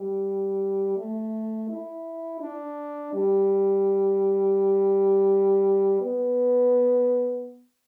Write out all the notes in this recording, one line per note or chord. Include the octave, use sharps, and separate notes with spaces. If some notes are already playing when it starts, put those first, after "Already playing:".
Already playing: G3
A3
E4
D4
G3
B3